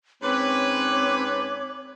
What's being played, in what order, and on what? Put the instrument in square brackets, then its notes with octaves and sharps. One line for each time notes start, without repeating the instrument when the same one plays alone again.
[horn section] G#2 C#4 B4 [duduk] C4 [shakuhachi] C#5 [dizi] D6